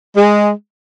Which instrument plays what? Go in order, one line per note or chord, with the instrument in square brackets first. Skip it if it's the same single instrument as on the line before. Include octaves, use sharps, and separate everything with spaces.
[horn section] G#3